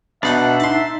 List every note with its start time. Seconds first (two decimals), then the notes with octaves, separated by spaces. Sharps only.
0.23 B2 D4 D#4 E5 F#5 A5
0.60 D#4 A5 C6